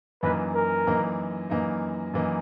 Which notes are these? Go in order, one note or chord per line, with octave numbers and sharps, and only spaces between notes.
F#2 E3 A#3 D#4 B4
A#4
F#2 E3 A#3 D#4
F#2 E3 A#3 D#4
F#2 E3 A#3 D#4